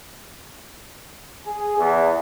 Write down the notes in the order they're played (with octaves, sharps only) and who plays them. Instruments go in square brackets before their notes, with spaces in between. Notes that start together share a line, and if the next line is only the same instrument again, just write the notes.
[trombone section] G#4
E2